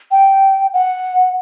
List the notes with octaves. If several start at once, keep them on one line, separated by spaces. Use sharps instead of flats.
G5
F#5